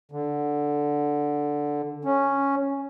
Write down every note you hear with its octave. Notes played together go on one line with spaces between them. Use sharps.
D3
C#4